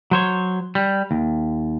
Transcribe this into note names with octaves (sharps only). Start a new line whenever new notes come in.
F#3 C5 C#5
G3
D#2